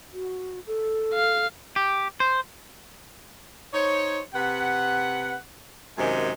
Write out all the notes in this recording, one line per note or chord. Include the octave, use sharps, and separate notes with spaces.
F#4
A4
F5
G4
C5
D#4 C5 C#5
C3 B4 F#5
F#2 C3 D#3 G#3